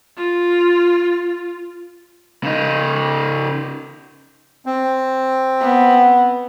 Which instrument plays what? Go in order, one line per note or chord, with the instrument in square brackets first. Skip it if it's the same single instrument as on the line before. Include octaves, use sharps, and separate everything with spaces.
[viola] F4
[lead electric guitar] C#3 D#4
[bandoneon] C4
[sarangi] B3